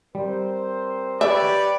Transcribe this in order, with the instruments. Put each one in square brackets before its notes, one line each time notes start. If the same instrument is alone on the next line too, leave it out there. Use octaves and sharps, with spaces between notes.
[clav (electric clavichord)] G3 [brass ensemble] C4 A#4 C5
[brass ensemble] G4 [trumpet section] B4 C#5 D5 [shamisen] E5